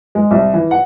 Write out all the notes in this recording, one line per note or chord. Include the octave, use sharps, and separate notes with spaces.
G#3
C2
E3
F#5